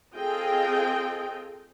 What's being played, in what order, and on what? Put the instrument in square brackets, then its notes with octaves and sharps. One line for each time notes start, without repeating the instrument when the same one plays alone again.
[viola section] C4 F4 G#4 A4 D#5 G5